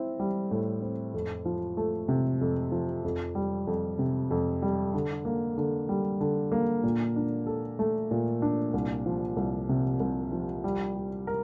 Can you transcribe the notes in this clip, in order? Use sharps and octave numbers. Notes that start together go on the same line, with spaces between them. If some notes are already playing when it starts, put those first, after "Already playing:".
Already playing: C4 E4
G3
A2
C4
F2
F3
A3
C3
F2
F3
F2
G3
F2
C3
F2
G3
D3
A#3
D3
G3
D3
A#3
A#2
D4
A4
A3
A#2
D4
C2
F3
C2
C3
C2
F3
G3
G4
A#4